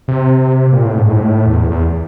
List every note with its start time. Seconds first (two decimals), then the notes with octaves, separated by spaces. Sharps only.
0.08 C3
0.73 A#2
0.85 A2
0.98 G#2
1.10 A2
1.16 G#2
1.22 A2
1.46 E2
1.71 E2